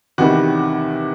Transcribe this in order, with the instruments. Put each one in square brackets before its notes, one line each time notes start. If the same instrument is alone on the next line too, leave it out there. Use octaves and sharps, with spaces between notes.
[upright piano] E2 C3 D#3 G3 F#4